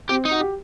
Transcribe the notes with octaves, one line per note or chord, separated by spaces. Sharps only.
C4 G4
D#4
F#4
G4